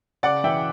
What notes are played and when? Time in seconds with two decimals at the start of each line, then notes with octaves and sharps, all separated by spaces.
0.23 C#3 D5 F#5
0.44 E3 E5 G5